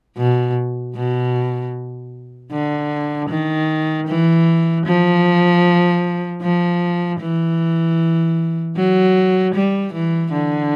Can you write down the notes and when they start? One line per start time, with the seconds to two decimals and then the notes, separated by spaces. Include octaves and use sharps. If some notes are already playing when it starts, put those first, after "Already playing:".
0.17 B2
0.95 B2
2.52 D3
3.29 D#3
4.08 E3
4.86 F3
6.42 F3
7.20 E3
8.76 F#3
9.54 G3
9.93 E3
10.33 D3